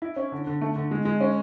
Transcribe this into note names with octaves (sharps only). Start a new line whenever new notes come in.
E4
C#4
D3
D3
A3
D3
G#3
G#3
C#4